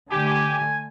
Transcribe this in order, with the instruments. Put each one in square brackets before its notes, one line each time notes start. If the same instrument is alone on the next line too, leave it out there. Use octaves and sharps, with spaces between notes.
[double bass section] D3 A3 [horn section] G4 [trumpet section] G#5